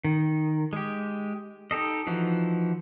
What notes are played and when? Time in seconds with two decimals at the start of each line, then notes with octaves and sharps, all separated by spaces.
0.04 D#3
0.73 G#3 G4
1.71 D#4 G4 A4 D#5
2.07 E3 F3 D#4 F#4